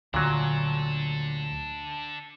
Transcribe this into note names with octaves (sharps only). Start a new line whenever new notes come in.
D2 A#2 F#3 D4 A4